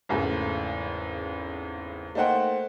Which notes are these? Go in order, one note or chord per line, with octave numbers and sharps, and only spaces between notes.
G#1 E2 C#3 A3
A3 A#3 D#4 C5 F#5 G5